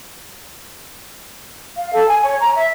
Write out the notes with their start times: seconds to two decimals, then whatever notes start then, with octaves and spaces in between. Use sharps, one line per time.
1.77 F5
1.93 A4
2.08 G#5
2.23 C#5
2.40 A#5
2.55 E5